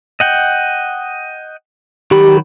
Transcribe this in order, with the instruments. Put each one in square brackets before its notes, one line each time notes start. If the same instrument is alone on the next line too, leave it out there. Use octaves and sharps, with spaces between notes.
[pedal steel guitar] D#5 F#5 G5
[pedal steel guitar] D#3 F#3 B5 [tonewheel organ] G4